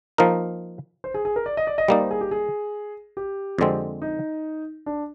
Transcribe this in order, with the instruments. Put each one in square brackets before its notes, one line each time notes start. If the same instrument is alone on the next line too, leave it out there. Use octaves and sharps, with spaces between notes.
[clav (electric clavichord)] F3 A#3 D#4 A#4
[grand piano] C5
G#4
G#4
A#4
D5
D#5
D5
D#5
[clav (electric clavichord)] G3 A#3 D#4 [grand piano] D5
[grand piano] C5
G#4
G4
G#4
G4
[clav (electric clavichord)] F2 D3 G#3 C4
[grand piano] D#4
D4